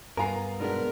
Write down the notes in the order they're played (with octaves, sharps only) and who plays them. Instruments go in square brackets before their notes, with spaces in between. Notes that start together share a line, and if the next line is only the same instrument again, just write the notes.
[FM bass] G2 [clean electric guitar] B3 F4 A#4 [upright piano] G#5 A#5 C7
[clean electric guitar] B2 B3 [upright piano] G#3 D4 [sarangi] A#4